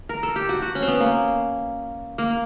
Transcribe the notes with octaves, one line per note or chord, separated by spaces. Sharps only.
A#4
A4
G4
F#4
F#4
C#4
C4
B3
A#3
A#3